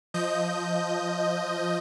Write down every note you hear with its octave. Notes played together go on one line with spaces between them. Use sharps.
F3 D#5 G6